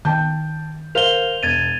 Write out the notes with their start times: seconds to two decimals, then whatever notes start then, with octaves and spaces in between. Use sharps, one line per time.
0.05 D#3 G5 A5 G6
0.95 A#4 C5 F5 F7 G7
1.43 E1 G#6 A6 D#7